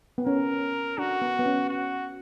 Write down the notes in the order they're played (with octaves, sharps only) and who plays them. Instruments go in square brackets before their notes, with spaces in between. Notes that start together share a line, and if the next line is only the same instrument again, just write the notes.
[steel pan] B3
[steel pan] C#4 [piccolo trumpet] A#4
[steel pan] D4 [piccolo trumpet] F#4
[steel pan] B3
B3
C#4
[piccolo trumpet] F#4